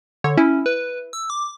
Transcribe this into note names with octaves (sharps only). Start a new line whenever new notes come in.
D3 C#5
C#4 E4
B4
E6
D6